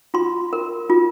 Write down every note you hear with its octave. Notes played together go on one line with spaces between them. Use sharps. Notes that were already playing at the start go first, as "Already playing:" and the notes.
F4 C6
A#4
F4